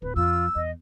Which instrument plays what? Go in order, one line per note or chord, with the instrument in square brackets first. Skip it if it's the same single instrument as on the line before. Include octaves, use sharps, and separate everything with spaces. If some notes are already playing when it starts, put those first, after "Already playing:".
[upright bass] D1 D2 [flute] B4
[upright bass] F2 [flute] F4 [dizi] E6
[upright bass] E2 [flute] D#5